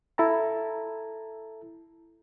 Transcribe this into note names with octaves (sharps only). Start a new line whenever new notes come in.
E4 A4 A5 A#5